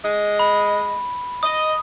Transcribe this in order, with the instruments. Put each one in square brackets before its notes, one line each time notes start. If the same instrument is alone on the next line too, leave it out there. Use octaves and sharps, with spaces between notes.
[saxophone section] G#3 D#5
[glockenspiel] B5
[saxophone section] D#5 [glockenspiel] D#6